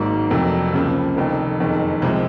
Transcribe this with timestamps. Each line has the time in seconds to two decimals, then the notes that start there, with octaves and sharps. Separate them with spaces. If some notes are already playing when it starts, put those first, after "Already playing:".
Already playing: G#1 G#2 F#3 A#3
0.30 F1 F2 C3 F#3 A#3
0.73 C#2 C#3 F3 A#3
1.16 F1 F2 D#3
1.60 F#1 F2 D#3
2.02 C2 C3 F3 G#3